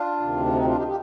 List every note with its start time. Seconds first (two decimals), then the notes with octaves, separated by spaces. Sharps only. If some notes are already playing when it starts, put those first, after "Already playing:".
Already playing: D4 F4
0.20 D2 C3 D#3
0.45 F4
0.54 C4 D#4
0.65 D4 F4
0.76 D#4 G4
0.87 G4